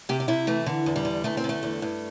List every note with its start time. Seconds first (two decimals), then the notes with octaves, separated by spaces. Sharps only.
0.09 C3 G4
0.20 G4
0.28 C3 E4
0.47 E3 A3
0.66 D3
0.86 E2
0.96 G3
1.05 D3
1.24 E2 A3
1.37 C4
1.44 D3
1.49 A3
1.63 E2
1.82 G2